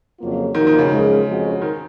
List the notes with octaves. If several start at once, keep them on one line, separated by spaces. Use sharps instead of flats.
F2 C#3 F#3 A#3 F4
A#2 D#3 F3 A#3 D#4 F#4
D#3
C#3
F#2 F3 G#3
F2 F3 G#3 C#4 F#4
D#3